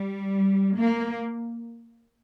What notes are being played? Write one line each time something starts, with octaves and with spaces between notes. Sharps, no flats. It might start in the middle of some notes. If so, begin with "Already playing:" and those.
Already playing: G3
A#3